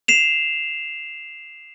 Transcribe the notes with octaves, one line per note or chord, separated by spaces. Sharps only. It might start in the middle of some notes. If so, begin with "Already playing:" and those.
C7 E7 F7